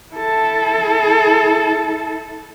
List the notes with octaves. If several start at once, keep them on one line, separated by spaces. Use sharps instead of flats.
E4 A4